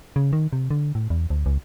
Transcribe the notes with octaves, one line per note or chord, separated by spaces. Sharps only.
C#3
D#3
C3
D3
A2
E2
D2
C#2